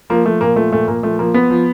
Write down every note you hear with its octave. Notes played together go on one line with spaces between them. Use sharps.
F3 A#3
F3 A3
A#2 A#3
F3 A3
A#2 A3
A#2 A#3
F3 A3
F3 A#3
F3 B3
F3